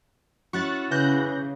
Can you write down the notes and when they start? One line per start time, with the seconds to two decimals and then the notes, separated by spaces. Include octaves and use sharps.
0.53 C#4 E4 F#4 C#6 F#6 A6
0.91 C#3 E3 F#6 G6 A#6